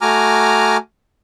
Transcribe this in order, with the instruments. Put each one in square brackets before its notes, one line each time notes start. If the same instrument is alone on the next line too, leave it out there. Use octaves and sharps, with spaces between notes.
[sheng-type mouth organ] A3 F#4 G#5 A#5 D6 F6